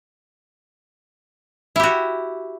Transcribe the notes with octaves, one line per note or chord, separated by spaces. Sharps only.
E4 F#4 G4